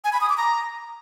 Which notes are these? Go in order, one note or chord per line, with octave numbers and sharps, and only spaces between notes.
G#5
B5
D#6
D6
A#5